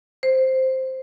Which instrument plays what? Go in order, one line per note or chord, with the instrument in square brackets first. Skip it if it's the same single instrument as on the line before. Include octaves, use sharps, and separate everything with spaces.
[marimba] C5